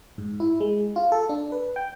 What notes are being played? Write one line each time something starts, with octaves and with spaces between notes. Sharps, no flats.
G#2
E4
G#3
F4
A4
D4
B4
G5